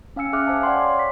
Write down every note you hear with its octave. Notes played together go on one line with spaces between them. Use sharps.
C#4 F5 G#5 E6 C#7
G#4 E5 F5 D6 F6 F#6
C5 F5 G#5 A5
D5 F#5 G5 C6
C#5 D6
C#5 B6